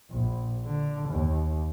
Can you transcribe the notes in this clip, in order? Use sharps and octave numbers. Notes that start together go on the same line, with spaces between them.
A#1
D3
D#2